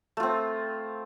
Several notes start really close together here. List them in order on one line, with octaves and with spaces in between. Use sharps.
A3 F4 C4